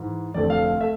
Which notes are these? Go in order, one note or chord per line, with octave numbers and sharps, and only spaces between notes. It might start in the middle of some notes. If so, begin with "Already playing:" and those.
Already playing: G#2 E3
F1 F2 D3 A3 C4 D5
F5
F5
A3 E5